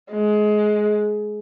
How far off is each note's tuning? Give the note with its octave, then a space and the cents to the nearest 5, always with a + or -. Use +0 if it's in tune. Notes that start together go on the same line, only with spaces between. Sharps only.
G#3 +20